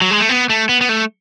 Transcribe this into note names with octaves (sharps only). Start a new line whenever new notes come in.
F#3
G#3
A3
B3
A3
B3
B3
A3